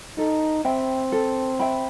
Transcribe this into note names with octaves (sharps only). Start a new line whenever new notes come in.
D#4 A4
C4 E5 G5 B5
A4
E5 G5 B5